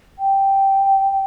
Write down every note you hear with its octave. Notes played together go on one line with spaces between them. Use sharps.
G5